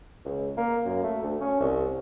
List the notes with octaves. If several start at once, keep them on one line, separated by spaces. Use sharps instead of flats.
C#2
A#3
F#2
A3
D2
C#4
C2